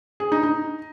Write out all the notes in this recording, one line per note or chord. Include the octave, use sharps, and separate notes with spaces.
G#4
D#4
D#4